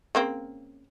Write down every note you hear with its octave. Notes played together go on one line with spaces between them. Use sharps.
C#3 A#3 C4